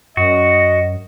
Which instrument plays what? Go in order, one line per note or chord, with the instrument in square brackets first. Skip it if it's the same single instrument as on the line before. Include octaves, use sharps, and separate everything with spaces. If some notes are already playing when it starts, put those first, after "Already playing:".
[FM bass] F#2 [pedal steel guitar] F#4 [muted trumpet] D#5